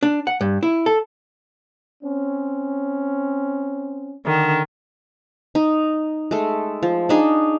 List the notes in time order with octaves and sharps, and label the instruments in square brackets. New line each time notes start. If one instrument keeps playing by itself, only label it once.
[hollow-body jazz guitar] D4
F#5
G2
E4
A4
[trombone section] C4 C#4
[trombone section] D3 [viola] D#3
[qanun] D#4
G#3 A3
F3
D4 D#4 G#4